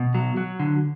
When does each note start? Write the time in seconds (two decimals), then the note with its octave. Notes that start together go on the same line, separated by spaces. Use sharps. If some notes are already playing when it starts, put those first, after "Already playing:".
Already playing: B2
0.14 F#3
0.37 F#3
0.59 D3